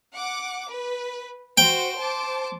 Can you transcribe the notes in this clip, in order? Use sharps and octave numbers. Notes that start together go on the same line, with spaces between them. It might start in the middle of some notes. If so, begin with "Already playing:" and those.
F#5 D6
B4
F#4 C5 G5
C5 A5 D6